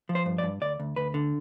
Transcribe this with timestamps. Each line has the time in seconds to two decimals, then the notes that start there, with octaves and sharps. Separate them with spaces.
0.09 F3
0.15 C5
0.26 G2
0.38 D5
0.43 G2
0.61 D2 D5
0.80 D2
0.96 D2 B4
1.14 D3